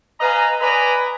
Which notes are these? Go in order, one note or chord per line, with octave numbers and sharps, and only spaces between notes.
B4 D#5 F5 G#5 A#5
B4 D5 D#5 G#5 A#5 B5